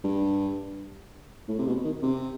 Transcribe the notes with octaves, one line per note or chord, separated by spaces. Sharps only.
G2
A2
C3
B2
D#3
C3